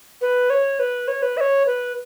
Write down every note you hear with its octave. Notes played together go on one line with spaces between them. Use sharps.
B4
C#5
B4
C#5
B4
E5
C#5
B4